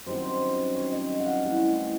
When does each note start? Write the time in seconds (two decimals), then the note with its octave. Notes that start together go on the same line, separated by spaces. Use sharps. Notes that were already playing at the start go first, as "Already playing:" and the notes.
0.06 F#2 D#3 G3 C4 C5
0.75 C#5
0.92 D#5
1.20 F#5
1.26 F5
1.43 A2 E3 G3 F#5